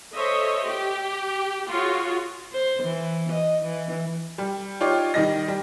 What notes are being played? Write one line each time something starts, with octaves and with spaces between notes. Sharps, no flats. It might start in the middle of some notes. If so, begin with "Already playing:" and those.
A4 C5 C#5 D#5 E5
G4
F4 F#4 G#4 C#5
C5
E3
D#5
E3
G3
D#4 F4 G4 C#5 D5
D#3 G3 D#5 A#6
G3